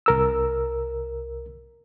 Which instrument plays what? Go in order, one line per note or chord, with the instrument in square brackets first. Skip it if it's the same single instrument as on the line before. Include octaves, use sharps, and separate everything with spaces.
[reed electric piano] C2 A#4 E6